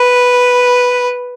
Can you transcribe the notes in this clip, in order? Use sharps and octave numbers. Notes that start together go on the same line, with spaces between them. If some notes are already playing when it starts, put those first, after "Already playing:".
Already playing: B4